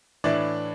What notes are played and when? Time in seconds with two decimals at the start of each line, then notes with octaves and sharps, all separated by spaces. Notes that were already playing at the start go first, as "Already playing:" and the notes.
0.24 A2 E3 D4 D5